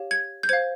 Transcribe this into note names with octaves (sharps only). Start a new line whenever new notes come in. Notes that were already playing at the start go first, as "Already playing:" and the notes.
Already playing: G4 C#5 F5
G#6
G6
C5 F5 G#6